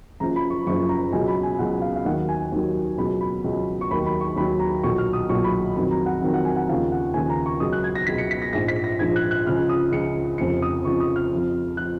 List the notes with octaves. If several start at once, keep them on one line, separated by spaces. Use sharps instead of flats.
F#1 F#2 F3 A#5
B5
C#6
F#1 F#2 F3 C#6
A#5
C#2 B2 F#3 G#5
B5
G#5
C#2 B2 F#3 F#5
F5
F5
D#2 D#3 F#3 F#5
G#5
D#2 D#3 F#3
C#2 B2 F#3 B5
B5
C#2 B2 F#3
C#6
D#2 D#3 F#3 B5
B5
C#6
D#2 D#3 F#3 B5
A#5
B1 A#2 F#3 C#6
F6
D#6
B1 A#2 F#3 C#6
B5
F2 D#3 F#3 B5
A#5
F#5
F2 D#3 F#3
F#5
G#5
F#5
D#2 C#3 F3 F5
F#5
D#2 C#3 F3 G#5
A#5
C#6
C#2 B2 F#3 D#6
F#6
G#6
A#6
C#2 B2 F#3 B6
C#7
B6
A#6
A#1 G#2 F3 A#6
B6
A#6
A#1 G#2 F3 G#6
F#6
F#6
C#2 C#3 F3 F6
D#6
C#2 C#3 F3 C#7
F1 F2 C#3 F3 C#7
D#6
F1 F2 C#3 F3 C#6
D#6
F6
F2 F3
F3 F#6